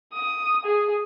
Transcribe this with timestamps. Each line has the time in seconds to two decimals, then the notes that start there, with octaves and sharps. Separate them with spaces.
0.13 D#6
0.65 G#4